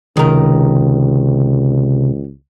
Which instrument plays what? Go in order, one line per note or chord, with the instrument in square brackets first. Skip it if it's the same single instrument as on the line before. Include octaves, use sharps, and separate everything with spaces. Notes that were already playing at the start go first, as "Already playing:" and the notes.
[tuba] C#2 [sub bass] C3 [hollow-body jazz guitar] D#3 A#4